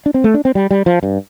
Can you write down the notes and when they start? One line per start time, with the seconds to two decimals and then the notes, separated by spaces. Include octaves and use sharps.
0.06 D4
0.14 C4
0.24 A3
0.34 D4
0.45 C4
0.55 G3
0.71 G3
0.86 F3
1.03 G2